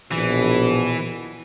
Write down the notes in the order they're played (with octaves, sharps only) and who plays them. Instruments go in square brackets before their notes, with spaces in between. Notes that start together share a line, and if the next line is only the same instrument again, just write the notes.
[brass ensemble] A#1 B2 [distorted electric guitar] E3